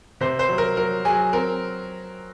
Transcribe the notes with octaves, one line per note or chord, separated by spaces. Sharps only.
C3 C5
C5
F#3
A#4
F#3 A#4
F#3 G#4
C4 A#4